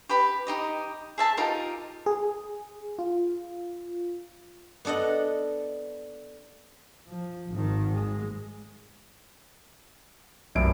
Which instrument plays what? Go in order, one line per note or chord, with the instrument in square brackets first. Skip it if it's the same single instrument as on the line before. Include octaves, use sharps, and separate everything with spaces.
[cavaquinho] G4 B4 B5
D#4 G4 D#5
G#4 E5 A5
D#4 F4 G4 A#4
[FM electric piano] G#4
F4
[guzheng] B3 D4 A4 D#5 F#5
[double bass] F3
G#1 D#3
G#3
[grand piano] F1 F#2 D7 [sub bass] B1